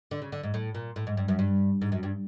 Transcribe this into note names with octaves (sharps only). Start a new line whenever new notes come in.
D3
C#3
D3
G#2
A2
A#2
A2
G#2
G2
F#2
G2
G#2
F#2
G2